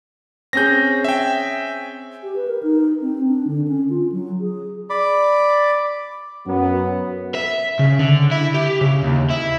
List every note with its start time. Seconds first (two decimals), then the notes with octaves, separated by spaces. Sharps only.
0.53 C4 C#4 G#4 G6 A#6
1.04 E5 G5
2.23 G4
2.36 B4
2.47 A#4
2.63 D#4
3.01 C4
3.28 D4
3.47 D3
3.68 C#4
3.89 F4
4.12 F#3
4.40 G#4
4.90 D5 B5 D6
6.47 F#2 F#3 B3
7.35 E5
7.79 C#3
7.99 D3
8.31 E4
8.54 G4
8.81 C#3
9.03 D#2
9.30 E4